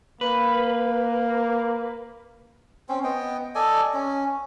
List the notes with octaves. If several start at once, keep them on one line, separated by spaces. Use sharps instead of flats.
A#3 B4
C4 C#4
B3 D#5 G5
A4 D5 D#5 G#5
C#4